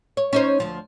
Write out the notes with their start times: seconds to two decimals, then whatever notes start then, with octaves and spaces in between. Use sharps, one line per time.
0.17 C#5
0.33 C#4 D#4 C5
0.60 D2 F3